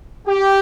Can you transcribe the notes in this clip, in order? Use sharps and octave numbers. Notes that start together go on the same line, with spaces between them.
G4